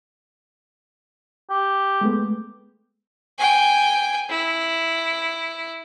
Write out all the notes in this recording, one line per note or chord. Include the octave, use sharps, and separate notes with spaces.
G4
G#3 A3 B3
G5 G#5
E4